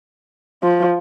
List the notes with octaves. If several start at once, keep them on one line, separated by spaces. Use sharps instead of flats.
F3